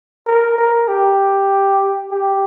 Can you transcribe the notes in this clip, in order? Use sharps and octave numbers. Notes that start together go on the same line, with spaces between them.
A#4
A#4
G4
G4